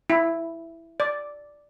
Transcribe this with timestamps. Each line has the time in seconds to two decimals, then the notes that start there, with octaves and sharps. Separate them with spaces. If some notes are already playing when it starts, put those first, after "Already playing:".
0.10 E4
1.00 D5